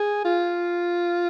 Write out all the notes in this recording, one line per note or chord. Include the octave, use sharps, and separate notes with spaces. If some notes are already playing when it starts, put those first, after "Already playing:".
Already playing: G#4
F4